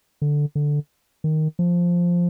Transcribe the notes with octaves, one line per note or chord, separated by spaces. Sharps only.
D3
D3
D#3
F3